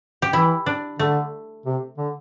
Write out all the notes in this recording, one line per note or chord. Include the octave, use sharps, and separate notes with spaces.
G4
E3 E4
D4
D3 A3
C3
D3